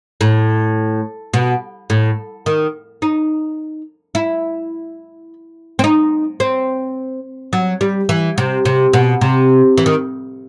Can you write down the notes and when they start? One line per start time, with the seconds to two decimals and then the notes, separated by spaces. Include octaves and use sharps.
0.21 A2
1.34 B2
1.90 A2
2.46 D#3
3.02 D#4
4.15 E4
5.79 C4
5.84 D#4
6.40 C4
7.53 F#3
7.81 G3
8.09 E3
8.38 C3
8.65 C3
8.93 B2
9.21 C3
9.78 E3
9.86 D#3